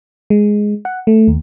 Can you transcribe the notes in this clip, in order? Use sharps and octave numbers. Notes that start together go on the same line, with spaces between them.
G#3
F#5
A3
D#2